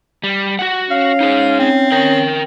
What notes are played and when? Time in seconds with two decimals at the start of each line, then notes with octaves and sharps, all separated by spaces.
0.24 G3
0.59 F#4 F#5
0.91 C#4 F5
1.20 D#4 G#4
1.59 C4
1.92 C#4 A#4 G5